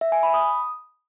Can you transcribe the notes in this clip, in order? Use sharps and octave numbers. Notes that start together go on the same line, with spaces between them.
E5
G#5
B5
D#6